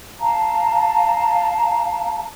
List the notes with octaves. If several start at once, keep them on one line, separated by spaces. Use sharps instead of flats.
F5 A5 A#5